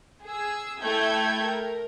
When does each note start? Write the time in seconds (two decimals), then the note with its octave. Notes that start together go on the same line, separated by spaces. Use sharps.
0.24 G#4 E6
0.81 A3 E4 E5 G5 G6 G#6
1.43 A#4